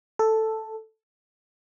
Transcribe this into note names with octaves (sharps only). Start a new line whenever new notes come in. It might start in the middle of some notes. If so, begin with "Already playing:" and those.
A4